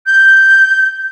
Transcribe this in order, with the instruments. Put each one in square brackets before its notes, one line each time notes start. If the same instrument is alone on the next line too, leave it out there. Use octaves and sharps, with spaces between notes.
[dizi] G6